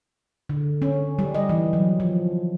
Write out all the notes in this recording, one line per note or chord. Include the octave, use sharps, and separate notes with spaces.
D3
C#4
G3
D#5
E3
F#3
F3